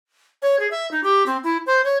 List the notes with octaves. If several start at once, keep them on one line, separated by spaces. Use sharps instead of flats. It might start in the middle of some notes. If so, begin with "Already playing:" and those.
C#5
G#4
E5
D#4
G4
C4
E4
C5
C#5